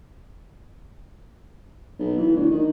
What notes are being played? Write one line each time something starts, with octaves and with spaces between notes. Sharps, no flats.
B1
E3
D2
D#3